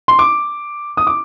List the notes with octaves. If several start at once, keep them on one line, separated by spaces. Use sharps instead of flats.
C6
D6
D#6
D6